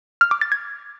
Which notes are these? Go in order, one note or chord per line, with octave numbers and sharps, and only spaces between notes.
F6
D6
A6
G#6